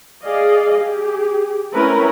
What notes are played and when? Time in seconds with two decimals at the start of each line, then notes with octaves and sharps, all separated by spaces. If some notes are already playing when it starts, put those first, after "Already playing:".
0.24 G#4 D5 D#5 F5
0.79 G4 G#4
1.73 A3 C4 C#4 E4 A#4 B4